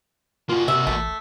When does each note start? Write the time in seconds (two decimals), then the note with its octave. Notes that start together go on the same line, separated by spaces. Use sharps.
0.49 A#3 F4 F#4
0.68 C3 E5
0.87 A1 A3